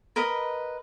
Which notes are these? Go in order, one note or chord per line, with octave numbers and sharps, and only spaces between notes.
A#4 B4 D#5 B5